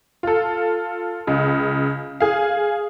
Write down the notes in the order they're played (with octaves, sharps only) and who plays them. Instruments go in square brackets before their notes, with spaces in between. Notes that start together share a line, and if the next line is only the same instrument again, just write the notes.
[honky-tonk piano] F4 A4
C#2 C#3
G#4 F5